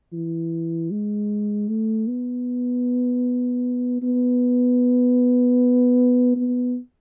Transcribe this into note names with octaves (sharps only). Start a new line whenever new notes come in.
E3
G#3
A3
B3
B3
B3